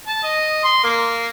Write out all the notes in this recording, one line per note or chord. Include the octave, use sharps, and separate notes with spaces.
A5
D#5
C6
A#3